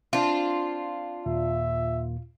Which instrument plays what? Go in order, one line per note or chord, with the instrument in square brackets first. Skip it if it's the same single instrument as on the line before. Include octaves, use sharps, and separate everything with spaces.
[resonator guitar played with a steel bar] C4 D4 [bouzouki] F4
[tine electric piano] D#2 A#2 [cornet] E5